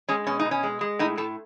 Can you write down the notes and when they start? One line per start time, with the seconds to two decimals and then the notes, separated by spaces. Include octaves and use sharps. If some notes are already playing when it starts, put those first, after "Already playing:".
0.09 G#3 C#4
0.27 B2 C#4
0.39 D#4
0.45 B2
0.51 C#4
0.63 G#3
0.81 G#3
0.99 A2 D#4
1.17 A2 A4